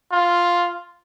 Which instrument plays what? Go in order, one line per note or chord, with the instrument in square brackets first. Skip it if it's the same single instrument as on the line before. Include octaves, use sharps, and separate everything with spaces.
[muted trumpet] F4